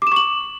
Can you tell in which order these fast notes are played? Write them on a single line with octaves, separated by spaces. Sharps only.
D6 E7 C#6 F#7